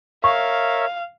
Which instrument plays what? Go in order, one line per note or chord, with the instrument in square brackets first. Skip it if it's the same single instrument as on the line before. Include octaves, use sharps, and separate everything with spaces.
[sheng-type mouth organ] A#4 C#5 E5 [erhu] F5 [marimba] C#6